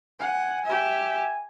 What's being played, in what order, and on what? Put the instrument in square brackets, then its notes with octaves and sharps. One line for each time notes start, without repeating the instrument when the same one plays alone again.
[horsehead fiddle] F#5 [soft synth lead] G#5
[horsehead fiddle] G4 E5